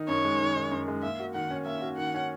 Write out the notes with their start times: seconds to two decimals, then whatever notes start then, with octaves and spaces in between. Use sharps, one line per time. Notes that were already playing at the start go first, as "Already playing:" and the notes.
Already playing: D#3 D#4
0.08 F#2 C#5
0.24 G#3
0.40 D#3
0.56 D#4
0.71 F#2
0.88 G#3
1.02 A#3 E5
1.19 F#4
1.34 D#3 F#5
1.50 C#4
1.66 A#3 E5
1.81 F#4
1.98 D#3 F#5
2.14 C#4